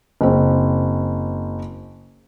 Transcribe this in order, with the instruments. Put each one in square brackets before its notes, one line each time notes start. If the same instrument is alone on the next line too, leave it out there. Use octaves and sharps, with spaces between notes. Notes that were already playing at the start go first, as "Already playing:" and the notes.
[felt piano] F#1 C4